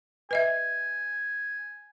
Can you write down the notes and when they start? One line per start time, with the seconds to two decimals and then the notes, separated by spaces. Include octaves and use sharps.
0.31 B4 D#5 E5 G#5